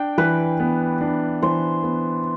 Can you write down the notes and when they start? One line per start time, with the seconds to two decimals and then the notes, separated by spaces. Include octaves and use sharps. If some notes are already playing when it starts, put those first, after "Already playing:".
Already playing: D4 G5
0.18 E3 B4
0.60 B3
1.01 D4
1.42 E3 C5
1.83 B3